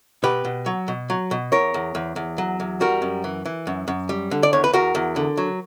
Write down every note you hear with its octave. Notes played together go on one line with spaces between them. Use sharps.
B2 G4 B4
B2
F#3
B2
F#3
B2
E2 A#4 C#5
E2
E2
E2
F#3
E2
G3 F#4 A#4
F#2
E3
E3
F#2
F#2
G3
D3
D5
E2 C#5
B4
E2 F#4 A#4
E2
D3
F#3